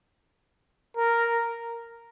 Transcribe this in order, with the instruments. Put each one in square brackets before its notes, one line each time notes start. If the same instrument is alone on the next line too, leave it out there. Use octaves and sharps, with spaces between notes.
[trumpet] A#4